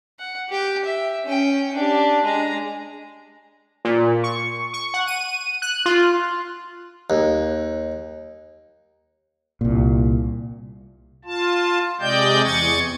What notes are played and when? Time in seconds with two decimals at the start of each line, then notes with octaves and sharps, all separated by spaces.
0.19 F#5
0.49 G4 G5
0.85 E5
1.25 C#4 G5
1.75 D4 G4
2.24 G#3 A#5
3.85 A#2
4.24 C#6
4.73 C#6
4.94 F#5
5.07 D#7
5.62 F#6
5.86 F4
7.10 D#2
9.61 C2 A#2
11.25 F4 A5
12.00 C3 G#3 D5 D#5 G5 G6
12.43 E2 C#6 G#6 A6